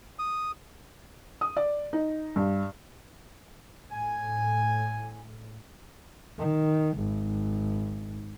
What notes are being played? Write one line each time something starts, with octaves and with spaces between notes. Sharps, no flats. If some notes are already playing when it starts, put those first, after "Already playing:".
D#6
D#6
D5
D#4
G2
A2 G#5
D#3
G#1